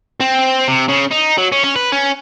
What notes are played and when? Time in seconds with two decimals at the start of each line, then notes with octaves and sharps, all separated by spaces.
0.20 C4
0.68 C3
0.89 C#3
1.11 D#4
1.38 F#3
1.52 C#4
1.64 C#4
1.76 B4
1.92 C#4